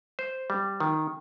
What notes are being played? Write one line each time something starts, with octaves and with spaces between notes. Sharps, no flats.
C5
G3
D#3